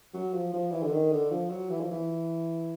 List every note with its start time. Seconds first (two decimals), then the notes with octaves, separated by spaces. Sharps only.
0.14 F#3
0.34 F3
0.53 F3
0.72 E3
0.83 D3
0.92 D#3
1.12 D3
1.31 F3
1.50 F#3
1.70 E3
1.81 F3
1.91 E3